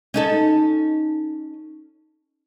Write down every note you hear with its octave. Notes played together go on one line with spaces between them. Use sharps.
C#4 D#4 A4